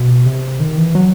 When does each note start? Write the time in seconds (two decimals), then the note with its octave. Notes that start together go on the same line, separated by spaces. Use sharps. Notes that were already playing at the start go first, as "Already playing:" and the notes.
Already playing: B2
0.26 C3
0.60 D#3
0.77 E3
0.95 F#3